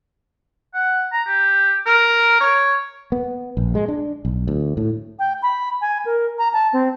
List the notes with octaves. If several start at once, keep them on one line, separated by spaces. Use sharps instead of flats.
F#5
A#5
G4
A#4
C#5
B3
A#1
G#3
D4
B1
D2
A2
G5
B5
G#5
A#4
A#5
A5
C4